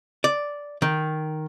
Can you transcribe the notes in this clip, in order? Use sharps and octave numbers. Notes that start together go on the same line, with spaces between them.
D5
D#3